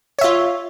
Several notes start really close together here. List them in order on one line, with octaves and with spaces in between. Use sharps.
C#5 E5 F4